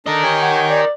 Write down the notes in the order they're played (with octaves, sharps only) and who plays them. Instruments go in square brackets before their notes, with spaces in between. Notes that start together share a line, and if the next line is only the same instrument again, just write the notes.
[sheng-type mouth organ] D4 A4 D5 [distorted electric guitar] A#4 D#5
[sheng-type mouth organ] G4 C#5 G#5
[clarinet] F#5
D5